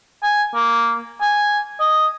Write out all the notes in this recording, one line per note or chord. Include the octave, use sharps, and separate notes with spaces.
G#5
A#3
G#5
D#5